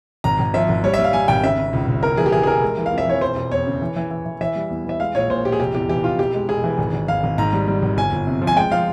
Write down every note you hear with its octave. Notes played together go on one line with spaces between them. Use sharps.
G#1 A#5
G#1
F3 E5
G#1
G3 C#5
E5
G3
F5
G3 G#5
G#1 G5
C#3 E5
C#3
C#2
C#2
E1 A#4
E3 G#4
G4
E3 G#4
G#4
E1 A#4
G#3
E3
F5
F2
E5
E3 C#5
E1 C5
E1
E2 C#5
C#3
E3
E3
E3
E3
E3 E5
G3
E2
E3 E5
G#3 F5
A#1 C#5
A#2 C5
A#1 G4
G#4
F1 G4
E2 G4
E3 G4
F1 F4
E1 G4
G#3
E1 G#4
E3
G#1
G#1
G#1 F5
G#1
G#2 A#5
G3
G3
G#1
G1 G#5
G1
C3
F3
G#5
G#3 G5
F3 F5